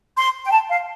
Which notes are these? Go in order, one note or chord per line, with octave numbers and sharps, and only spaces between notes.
C6
G5
A5
F5